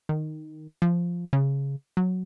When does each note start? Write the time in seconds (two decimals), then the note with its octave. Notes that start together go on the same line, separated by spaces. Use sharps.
0.09 D#3
0.82 F3
1.33 C#3
1.97 F#3